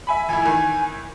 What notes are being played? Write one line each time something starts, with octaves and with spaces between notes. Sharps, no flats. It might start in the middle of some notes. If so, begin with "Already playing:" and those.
E5 G#5 B5
F1 E4 G#5
D#3 E3